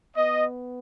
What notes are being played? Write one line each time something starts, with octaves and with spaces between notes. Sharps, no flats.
B3 D#5